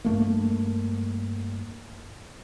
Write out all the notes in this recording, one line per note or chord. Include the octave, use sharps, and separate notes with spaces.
G2 A3 A#3